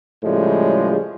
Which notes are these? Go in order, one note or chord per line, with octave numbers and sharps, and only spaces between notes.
A2 C#3 F3 G3 G#3